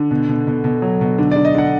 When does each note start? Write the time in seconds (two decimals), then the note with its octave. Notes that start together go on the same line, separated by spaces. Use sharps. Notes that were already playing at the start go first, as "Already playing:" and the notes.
Already playing: D3
0.11 B2
0.29 B2
0.47 B2
0.64 B2
0.82 F#3
1.01 B2
1.18 D3
1.31 D3 D5
1.45 D#5
1.55 D3 F#5